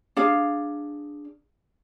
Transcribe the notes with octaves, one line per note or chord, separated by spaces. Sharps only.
D4 G#4 F5